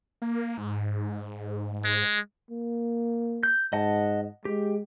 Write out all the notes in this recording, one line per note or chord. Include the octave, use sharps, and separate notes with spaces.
A#3
G#2
G#3
A#3
G6
G#2 D#5 F#5 A5
G#3 G4